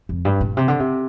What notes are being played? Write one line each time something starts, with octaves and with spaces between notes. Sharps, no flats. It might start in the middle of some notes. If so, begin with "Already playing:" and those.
F2
G2
A#2
C3
D3
C3